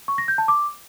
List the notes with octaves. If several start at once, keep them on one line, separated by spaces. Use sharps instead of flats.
C#6
A#6
G6
A5
D6